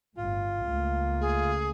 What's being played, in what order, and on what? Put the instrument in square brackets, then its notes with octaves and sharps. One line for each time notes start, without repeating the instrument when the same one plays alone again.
[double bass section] G1 A2 [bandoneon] F4
[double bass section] C#2 A3 A#3
[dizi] G#4